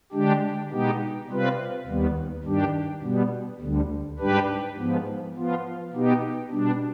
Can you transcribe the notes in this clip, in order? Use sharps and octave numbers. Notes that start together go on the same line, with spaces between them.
D3 G#3 D4 G4
B2 G#3 B3 D#4 G4
C3 G3 C4 F4 B4
D#2 D#3 G3 B3
G2 D#3 G3 D4 G4
B2 G3 B3
D2 D3 G3
G#2 G3 D4 G4 B4
G#2 F3 B3
F3 B3 F4
B2 B3 D#4 G4
B2 G3 D4